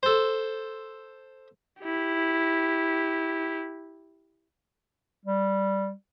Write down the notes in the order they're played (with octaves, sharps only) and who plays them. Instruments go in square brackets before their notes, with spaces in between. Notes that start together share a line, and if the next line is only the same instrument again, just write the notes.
[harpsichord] A4 C5
[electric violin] E4 G4
[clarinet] G3